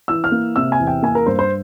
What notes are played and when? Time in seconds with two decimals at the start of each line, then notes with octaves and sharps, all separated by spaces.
0.08 E3 E6
0.24 F6
0.32 A#3
0.56 C3 E6
0.72 G#5
0.80 E2
0.87 G5
1.02 A#3 G#5
1.15 A#4
1.26 G2 C5
1.39 C5